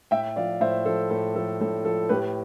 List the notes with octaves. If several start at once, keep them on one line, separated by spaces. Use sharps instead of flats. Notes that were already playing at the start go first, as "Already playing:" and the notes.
A2 E5 G5
F3 D5 F5
A2 C5 E5
F3 A4 C5
A2 A4
F3 A4
A2 A4
F3 A4
A2 G4 B4